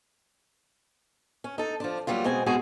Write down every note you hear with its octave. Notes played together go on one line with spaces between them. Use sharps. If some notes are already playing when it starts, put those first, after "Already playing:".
C#4
D#4 A4
F3 D4
F#3 G3 A#3 F4
B2 G#3 C4 G#5
B2 G#3 F#4 G#4 G#5